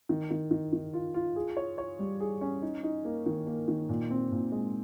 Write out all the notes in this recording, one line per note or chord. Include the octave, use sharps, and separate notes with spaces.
D#3
D#3
D#3
D#3
F4
F4
G#4
C#5
C#5
G3
G#4
C#4
D#4
D#4
A#3
D#3
A#3
D#3
A#2
C4
A#2
G#3